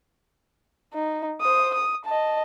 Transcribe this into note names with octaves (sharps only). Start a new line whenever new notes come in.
D#4
C5 D#6
D#6
D#5 A5